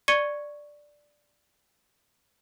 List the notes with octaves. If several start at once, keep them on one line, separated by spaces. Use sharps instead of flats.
D5 C#6 G#6 C#7 D#7 G7